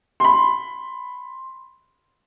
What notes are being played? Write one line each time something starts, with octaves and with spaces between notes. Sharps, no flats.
B5 C6